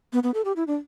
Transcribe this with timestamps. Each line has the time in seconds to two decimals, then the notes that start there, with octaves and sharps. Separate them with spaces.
0.13 B3
0.23 B3
0.34 A4
0.45 G4
0.56 E4
0.67 D4